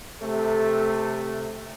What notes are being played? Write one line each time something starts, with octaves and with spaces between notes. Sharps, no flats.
C3 A3